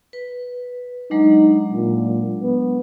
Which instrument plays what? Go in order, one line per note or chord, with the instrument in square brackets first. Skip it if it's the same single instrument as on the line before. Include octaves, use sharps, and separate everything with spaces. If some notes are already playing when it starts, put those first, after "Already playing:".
[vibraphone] B4
[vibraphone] F#3 G#3 D4 [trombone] D#4
[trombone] A#2
B3